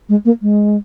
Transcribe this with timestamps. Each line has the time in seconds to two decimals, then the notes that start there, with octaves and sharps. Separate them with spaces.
0.09 G#3
0.25 A#3
0.42 G#3